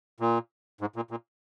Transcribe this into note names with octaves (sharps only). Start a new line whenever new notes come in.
A#2
G#2
A#2
A#2